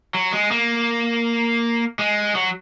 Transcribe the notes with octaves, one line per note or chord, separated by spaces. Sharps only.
F#3
G#3
A#3
G#3
F#3